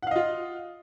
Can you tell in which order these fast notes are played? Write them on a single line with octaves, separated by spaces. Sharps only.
F#5 F5 D#5 F4